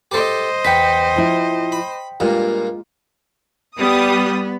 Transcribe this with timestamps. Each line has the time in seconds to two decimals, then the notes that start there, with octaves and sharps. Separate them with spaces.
0.11 G4 A4 C5 D#5
0.65 E2 B4 G5 B6
1.16 F3 E4
1.72 B5
2.20 G2 A#2 G#3 A#3 F4
3.77 G3 B3 D#6